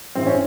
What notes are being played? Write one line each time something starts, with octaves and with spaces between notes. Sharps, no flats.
G2 E3 C4
C#4